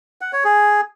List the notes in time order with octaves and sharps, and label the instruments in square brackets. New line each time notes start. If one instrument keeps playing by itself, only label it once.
[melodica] F#5
C#5
G#4